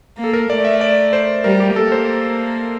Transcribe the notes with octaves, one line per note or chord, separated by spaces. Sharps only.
A#3
A4
A#4
A3 D5
E5
D5
C5
G3 A#4
G4
A#3 A4
C5